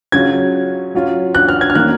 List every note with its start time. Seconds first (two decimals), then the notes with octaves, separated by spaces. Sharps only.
0.12 C#3 F#3 C#4 F4 G#6
0.95 F#3 C#4 F4
1.35 F#6
1.48 F6
1.61 G#6
1.70 F6
1.75 D#3 F#3 A#3 C#4 F#6